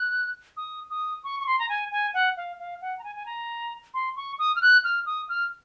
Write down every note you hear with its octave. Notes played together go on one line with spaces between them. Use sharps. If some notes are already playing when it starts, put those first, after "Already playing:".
Already playing: F#6
D#6
D#6
C#6
C#6
C6
A#5
G#5
G#5
F#5
F5
F5
F#5
A#5
G#5
G#5
A#5
C6
C#6
D#6
F6
F#6
F6
D#6
F6